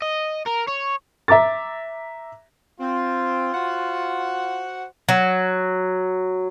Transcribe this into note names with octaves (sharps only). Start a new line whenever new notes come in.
D#5
A#4
C#5
E5 A#5 D6 A6
C4 F4
F#4 C5 F#5
F#3